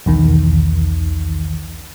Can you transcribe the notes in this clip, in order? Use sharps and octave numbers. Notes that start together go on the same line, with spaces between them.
B1 E2 D#3